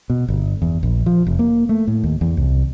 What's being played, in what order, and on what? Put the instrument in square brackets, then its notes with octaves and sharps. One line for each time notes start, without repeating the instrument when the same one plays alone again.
[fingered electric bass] B2
G1
E2
A#1
F3
F1
A#3
A3
A2
D#2
E2
C2